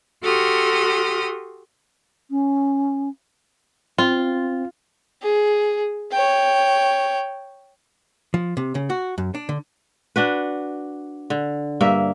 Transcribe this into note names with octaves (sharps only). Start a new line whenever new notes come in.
F#4 G4 A4 C6 D#6 F6
C#4
C4 F4
G#4
C#5 G5
F3
C3
C#3
F#4
F#2
D4
D3
D4 F#4 B4
D3
G2 A#3 E5